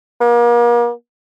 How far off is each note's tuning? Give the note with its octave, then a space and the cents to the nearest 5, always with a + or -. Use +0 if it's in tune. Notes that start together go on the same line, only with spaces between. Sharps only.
A#3 +40